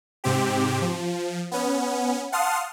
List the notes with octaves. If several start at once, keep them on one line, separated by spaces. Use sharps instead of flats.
G#2 C3 C4 G4
F3
B3 C#4
F5 F#5 A5 C6 D#6 F6